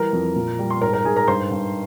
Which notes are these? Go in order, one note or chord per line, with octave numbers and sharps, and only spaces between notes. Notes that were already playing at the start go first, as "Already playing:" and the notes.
Already playing: E3 G3 A#4 A#5
F2
A#2
G3
C6
G#2 A#4 A#5
A#4 A#5
G#2 G#4 G#5
A#4 A#5
G2 C5 C6
G2